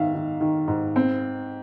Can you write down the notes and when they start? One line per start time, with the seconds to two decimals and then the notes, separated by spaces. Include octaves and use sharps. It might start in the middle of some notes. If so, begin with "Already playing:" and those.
Already playing: G#2 D#3 E5 F5
0.14 D#3
0.41 D#3
0.68 G#2
0.96 C4